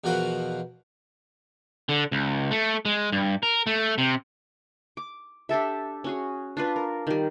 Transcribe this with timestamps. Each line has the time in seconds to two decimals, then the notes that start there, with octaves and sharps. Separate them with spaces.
0.04 E2 B2 F3 F#4 A#4 B4
1.89 D3
2.12 C#2
2.51 A3
2.85 G#3
3.12 G2
3.43 A#4
3.67 A3
3.98 C3
4.97 D6
5.49 D4 G4 A4 E5
6.04 C#4 F#4 G#4
6.57 D4 F4 B4
6.76 A#4
7.07 D#3 G3